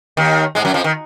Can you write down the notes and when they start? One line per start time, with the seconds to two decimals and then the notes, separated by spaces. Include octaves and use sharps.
0.17 D#2 D#3
0.55 G#2 G#3
0.65 F#2 F#3
0.74 F2 F3
0.84 D#3